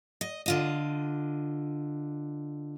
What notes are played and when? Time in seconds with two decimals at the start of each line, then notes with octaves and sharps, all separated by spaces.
0.21 D#5
0.46 D3 F4 D#5